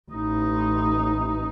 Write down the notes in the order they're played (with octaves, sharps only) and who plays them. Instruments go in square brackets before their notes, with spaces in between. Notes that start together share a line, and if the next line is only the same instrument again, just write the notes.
[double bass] A1 D#4